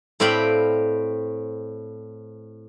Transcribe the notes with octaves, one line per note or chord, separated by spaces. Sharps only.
A2 C4 D5 F5 G5 B5